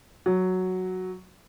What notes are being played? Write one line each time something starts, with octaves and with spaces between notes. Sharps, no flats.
F#3